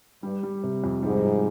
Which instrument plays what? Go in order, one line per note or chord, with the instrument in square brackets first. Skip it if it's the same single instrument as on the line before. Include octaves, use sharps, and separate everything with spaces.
[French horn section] G2 [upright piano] G3
[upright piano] G3
C3
F2
[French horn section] G#2 [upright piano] G3
[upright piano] F2